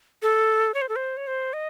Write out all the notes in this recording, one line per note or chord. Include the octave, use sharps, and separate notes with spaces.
A4
C#5
C5
A4
C5
C#5
C5
D#5